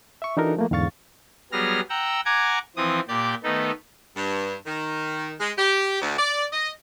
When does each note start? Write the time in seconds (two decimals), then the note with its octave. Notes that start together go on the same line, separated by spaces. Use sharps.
0.22 E5 C#6
0.37 E3 D4 D#4 F#4 A4 A#4
0.57 F3 A3 A#3
0.71 E2 G#2 D3 F5 C#6 A6
1.52 F#3 G3 B3 G#4 F6 A#6
1.90 F#5 G5 A#5 E6
2.25 F#5 G#5 A#5 D6 G#6
2.76 E3 F3 C4 D#6
3.08 A#2 G4 D5 G6
3.43 D#3 A3 B3 D#4 A4
4.15 G2
4.66 D#3
5.39 G#3
5.57 G4
6.01 D2
6.17 D5
6.52 D#5